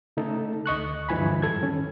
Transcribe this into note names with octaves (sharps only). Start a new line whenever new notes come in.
C#3 A3 D#4 A4
D2 D#5 C#6 F#6
G2 D3 E3 F3 G#5 B5
F2 G#2 G3 A4 G#6
D#3 C#4